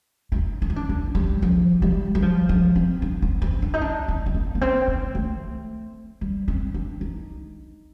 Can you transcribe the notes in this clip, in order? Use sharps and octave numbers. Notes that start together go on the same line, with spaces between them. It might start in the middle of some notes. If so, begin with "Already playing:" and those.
D4
D#4
D4
D#4
D4
D4
G3
F3
G3
G3
F3
F3
C4
D4
C4
C4
D4
D#4
D4
C4
C4
A#3
A#3
C4
D4
A3
G3
C4
D4
D#4